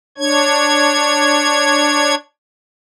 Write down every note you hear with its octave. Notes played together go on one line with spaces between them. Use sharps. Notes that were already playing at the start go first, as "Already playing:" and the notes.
D4 C#5 G#6